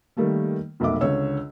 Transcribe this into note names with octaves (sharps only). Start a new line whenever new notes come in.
D#3 G3 A3 A#3
F1 B1 A#3 E5 D6
C#2 D3 C#5 E6